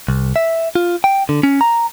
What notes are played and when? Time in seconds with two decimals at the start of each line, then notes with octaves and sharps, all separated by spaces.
0.08 C2
0.36 E5
0.75 F4
1.04 G5
1.29 D3
1.43 C#4
1.61 A#5